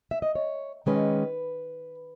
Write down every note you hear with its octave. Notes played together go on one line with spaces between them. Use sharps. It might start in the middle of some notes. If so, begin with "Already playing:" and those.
E5
D#5
C#5
D#3 G#3 C#4 B4